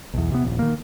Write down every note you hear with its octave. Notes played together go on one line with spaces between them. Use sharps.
B1 E2
C3 B3
D#1 A#1
D#3 A#3